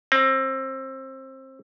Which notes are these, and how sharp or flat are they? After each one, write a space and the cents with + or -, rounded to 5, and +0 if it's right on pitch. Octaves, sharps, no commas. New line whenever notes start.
C4 +25